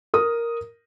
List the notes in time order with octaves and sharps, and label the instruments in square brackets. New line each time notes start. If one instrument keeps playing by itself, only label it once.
[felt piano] A#4 D#6